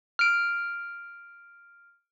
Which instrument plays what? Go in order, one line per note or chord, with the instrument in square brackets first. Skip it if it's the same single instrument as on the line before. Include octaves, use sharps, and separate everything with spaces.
[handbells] F6 D7